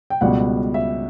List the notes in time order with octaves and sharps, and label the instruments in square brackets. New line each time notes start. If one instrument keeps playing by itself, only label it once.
[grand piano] G5
C#2 B2 G3 F#5
E5